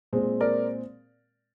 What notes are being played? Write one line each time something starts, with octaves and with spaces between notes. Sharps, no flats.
A#2 G#3 C4
A#4 D5